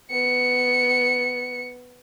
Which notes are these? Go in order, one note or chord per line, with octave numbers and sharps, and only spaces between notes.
B3 C#7